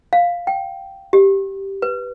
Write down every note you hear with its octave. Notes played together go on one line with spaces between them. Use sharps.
F5
G5
G4
B4